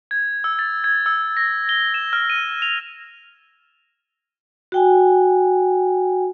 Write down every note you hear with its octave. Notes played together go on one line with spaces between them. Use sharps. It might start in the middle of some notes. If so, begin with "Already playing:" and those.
G#6
E6
A6
G#6
E6
A#6
G7
E7
F6
D#7
F7
F#4 G5 G#5